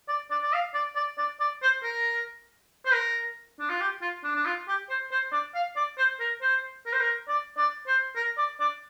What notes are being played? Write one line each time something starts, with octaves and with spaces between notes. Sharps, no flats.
D5
D5
D5
F5
D5
D5
D5
D5
C5
A#4
C5
A#4
D4
F4
G4
F4
D4
D4
F4
G4
C5
C5
D5
F5
D5
C5
A#4
C5
A#4
C5
A#4
D5
D5
C5
A#4
D5
D5